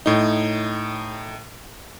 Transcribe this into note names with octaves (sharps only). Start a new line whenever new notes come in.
A2 D#4